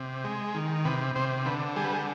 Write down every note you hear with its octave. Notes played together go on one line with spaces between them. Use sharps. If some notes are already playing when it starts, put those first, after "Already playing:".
Already playing: C3
G#3
D#3
C3 B4
C3 C5
D3 B4
G3 G#4
B4
G#4